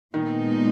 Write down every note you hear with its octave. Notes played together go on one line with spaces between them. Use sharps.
A#2 D#3 G#3 B3 D#4